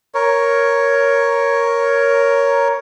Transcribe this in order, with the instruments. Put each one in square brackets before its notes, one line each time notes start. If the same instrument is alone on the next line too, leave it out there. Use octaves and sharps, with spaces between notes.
[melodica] A#4 C#5